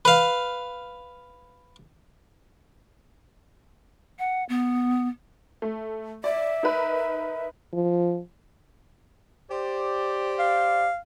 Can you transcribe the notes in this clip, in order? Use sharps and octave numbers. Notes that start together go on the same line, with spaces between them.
B4 F5
F#5
B3
A3
D5 E5
D#4 A#4 B4
F3
G4 C5 D5
F5